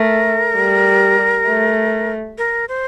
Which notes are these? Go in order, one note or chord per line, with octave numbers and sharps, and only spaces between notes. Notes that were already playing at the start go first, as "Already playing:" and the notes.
Already playing: A3 A#4
G3
A3
A#4
C5